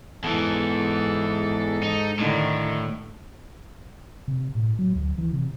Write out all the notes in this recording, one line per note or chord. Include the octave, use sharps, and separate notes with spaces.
E2 G#2 E3 A4
D#4
A2 D3 D#3
C3
A2
F#3
D2
E3
C3